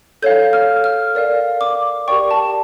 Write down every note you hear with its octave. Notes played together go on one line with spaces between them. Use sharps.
A4 C#5 F5 G6
F6
F6
A#4 D5 F5
D6
G4 A#4 D5 G5 C#6
A5